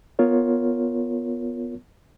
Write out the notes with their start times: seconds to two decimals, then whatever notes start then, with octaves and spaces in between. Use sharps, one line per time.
0.19 B3 F4 A#4 C#5